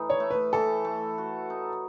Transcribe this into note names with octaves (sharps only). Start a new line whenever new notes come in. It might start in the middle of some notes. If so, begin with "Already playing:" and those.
Already playing: A2 E3 D#4
C#5
A3
B4
E3 A4
A3
F#4
D#4